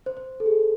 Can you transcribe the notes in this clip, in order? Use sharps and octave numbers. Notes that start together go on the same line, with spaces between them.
C5
C5
A4
G#4